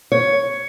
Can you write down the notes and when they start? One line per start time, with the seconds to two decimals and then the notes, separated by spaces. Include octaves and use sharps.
0.12 C#5